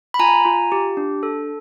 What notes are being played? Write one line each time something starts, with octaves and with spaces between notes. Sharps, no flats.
B5
F4 G#5 A#5
F4
G4
D4
A4